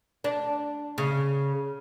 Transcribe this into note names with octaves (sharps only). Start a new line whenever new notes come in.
D4
C#3